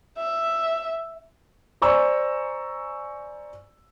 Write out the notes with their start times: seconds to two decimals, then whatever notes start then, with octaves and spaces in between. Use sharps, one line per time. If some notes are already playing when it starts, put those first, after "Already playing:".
0.18 E5
1.82 C5 D5 G#5 A#5 C#6 E6